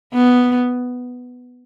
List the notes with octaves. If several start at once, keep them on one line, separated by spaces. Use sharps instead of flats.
B3